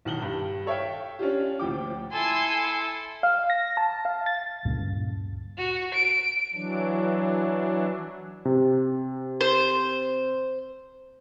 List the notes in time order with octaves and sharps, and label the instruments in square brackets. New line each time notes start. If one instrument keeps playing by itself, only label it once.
[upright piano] B1 D#3 F#7 G7
G2
A4 C#5 E5 F5 G5
C#4 D4 F4 G4
D2 A#2 F3 G5 D6
[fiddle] E4 A4 [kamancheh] G#5 C6
[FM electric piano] F5
A#6
A5
F5
A6
[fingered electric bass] D2 G2 A#2 C#3
[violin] F#4
D7
[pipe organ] E3 F#3 D4
[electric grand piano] C3
[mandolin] C5